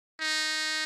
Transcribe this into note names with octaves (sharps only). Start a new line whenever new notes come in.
D#4